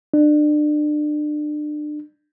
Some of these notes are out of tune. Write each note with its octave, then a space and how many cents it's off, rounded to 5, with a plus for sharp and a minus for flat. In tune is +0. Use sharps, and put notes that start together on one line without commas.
D4 +30